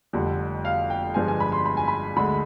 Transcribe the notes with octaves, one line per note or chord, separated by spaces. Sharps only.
F1 F2 D3 G3
F5
G5
G1 G2 F3 G#3 G#5
G#5
B5
C6
B5
G#5
B5
D2 D3 G#3 B5